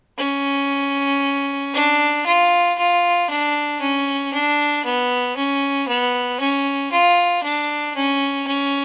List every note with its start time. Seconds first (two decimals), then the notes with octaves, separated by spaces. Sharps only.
0.19 C#4
1.74 D4
2.26 F4
2.78 F4
3.30 D4
3.81 C#4
4.33 D4
4.85 B3
5.37 C#4
5.88 B3
6.40 C#4
6.92 F4
7.43 D4
7.96 C#4
8.47 C#4